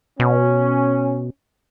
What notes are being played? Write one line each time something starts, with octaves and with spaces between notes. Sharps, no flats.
B2 C#4